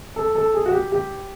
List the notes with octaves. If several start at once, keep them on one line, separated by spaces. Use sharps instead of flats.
A4
A4
G#4
F#4
G4
G4